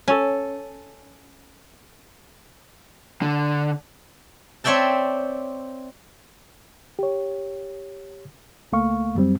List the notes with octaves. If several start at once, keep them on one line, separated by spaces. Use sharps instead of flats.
C#4 A4 G#5
D3
C4 C#5 D5 E5 G5 A5
G4 C#5
C#2 A3 A#3 F5 C#6
F#2 F#3 G3 C4